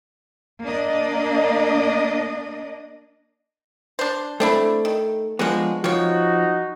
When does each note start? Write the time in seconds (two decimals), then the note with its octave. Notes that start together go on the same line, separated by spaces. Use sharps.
0.62 A#3 D4 D#5
3.99 D4 C5
4.40 A3 C4 D4 E4
4.85 D#3
5.39 F3 G#3 B3 D4 F#4
5.84 F3 C4 D#4 F#4 C#5